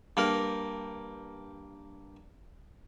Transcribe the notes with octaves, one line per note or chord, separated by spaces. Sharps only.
G2 A#3 A#4